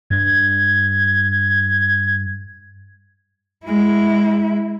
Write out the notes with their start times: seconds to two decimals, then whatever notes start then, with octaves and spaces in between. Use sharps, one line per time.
0.10 G2 D4 G#6
3.65 G#3 E4